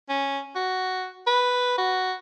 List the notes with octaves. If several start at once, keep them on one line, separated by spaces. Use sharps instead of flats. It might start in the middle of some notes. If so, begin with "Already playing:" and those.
C#4
F#4
B4
F#4